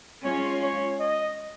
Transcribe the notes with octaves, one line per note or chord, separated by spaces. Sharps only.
G#3 C#4 F4 C#5
C#5
D#5